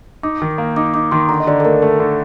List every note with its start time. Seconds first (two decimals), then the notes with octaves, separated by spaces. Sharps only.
0.23 D#4 D6
0.42 D#3
0.58 A#3
0.76 D#4 D6
0.94 D#4 D6
1.12 D#3 C6
1.29 D3 A#5
1.40 D#5
1.47 D3 D5
1.60 A4
1.65 A3 A#4
1.82 A3 A4
1.99 D3